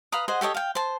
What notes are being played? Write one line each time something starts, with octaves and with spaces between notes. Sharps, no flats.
B4 F5 A#5 D#6
G#4 C5 D#5 F#5
G4 A4 C#5 D#5
F5 G5
C5 A5